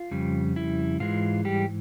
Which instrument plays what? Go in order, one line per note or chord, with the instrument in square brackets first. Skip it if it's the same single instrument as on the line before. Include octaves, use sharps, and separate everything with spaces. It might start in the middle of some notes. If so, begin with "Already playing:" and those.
Already playing: [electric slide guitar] F4
F2 C#3 G3
E4
G#2 E3 G#3 F4
G3 G4